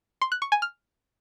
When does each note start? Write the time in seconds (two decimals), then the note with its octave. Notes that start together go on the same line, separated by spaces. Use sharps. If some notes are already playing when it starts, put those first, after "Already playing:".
0.22 C6
0.32 F#6
0.42 C#6
0.52 G#5
0.62 F6